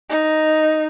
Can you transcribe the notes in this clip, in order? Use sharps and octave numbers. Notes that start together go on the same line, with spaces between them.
D#4